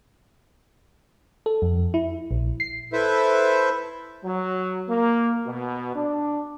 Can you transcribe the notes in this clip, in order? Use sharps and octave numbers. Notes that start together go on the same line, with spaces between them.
A4
F2
E4
A#1
C7
E4 A4 B4 C5 E5
F#3
A#3
B2
D4